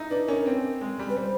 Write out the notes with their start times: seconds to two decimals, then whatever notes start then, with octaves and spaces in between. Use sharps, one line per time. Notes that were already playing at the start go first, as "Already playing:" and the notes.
Already playing: D#4 E4
0.11 D4 B4
0.28 C#4 A#4
0.46 C4
0.81 G#3
0.99 G3
1.10 B4
1.17 G3 C5